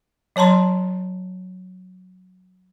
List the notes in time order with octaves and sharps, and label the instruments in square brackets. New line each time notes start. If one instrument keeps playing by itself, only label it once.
[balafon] F#3 C#5 A5 A#5 C6